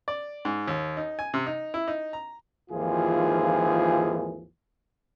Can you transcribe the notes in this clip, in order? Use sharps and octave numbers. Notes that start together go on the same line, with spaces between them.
D5
G#2
D#2
D#4
G#5
C3
D#4
E4
D#4
A#5
G#1 D#2 E3 F3 F4 G#4